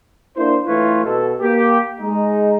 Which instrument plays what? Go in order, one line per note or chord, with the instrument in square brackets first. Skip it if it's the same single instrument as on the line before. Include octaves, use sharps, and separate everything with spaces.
[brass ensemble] A#3 D4 E4 C5
E3 A3 E4 F4 B4 C#5
B2 A4
A#3 G4
G#3 D#4